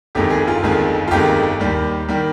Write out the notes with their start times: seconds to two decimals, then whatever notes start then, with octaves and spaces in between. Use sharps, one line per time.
0.15 G1 F2 D#3 G#3 G4
0.30 G#4
0.47 F4
0.62 G1 F2 D#3 G#3
1.07 F4
1.11 G1 F2 D#3 G#3 G4
1.60 D#2 D#3 G3
2.09 D#3 G3